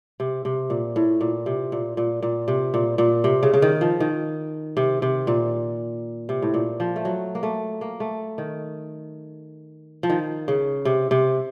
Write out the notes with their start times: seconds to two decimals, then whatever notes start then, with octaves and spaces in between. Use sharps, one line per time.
0.20 C3
0.45 C3
0.70 A#2
0.96 A2
1.21 A#2
1.46 C3
1.72 A#2
1.97 A#2
2.22 A#2
2.48 C3
2.74 A#2
2.98 A#2
3.24 C3
3.43 C#3
3.54 C#3
3.62 D#3
3.81 F3
4.00 D#3
4.77 C3
5.02 C3
5.27 A#2
6.29 C3
6.42 A2
6.54 A#2
6.80 F3
6.96 A3
7.05 F#3
7.35 A#3
7.43 A3
7.81 A#3
8.00 A3
8.38 D#3
10.03 F3
10.10 D#3
10.48 C#3
10.85 C3
11.11 C3